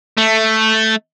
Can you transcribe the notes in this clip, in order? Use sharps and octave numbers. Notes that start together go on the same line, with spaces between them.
A3